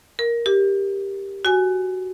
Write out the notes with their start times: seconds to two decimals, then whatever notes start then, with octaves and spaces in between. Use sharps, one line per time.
0.19 A#4
0.46 G4
1.45 F#4 G#5